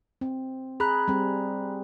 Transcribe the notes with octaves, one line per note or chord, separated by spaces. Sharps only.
C4
G#4 A#5 B5 F#6
G3 C4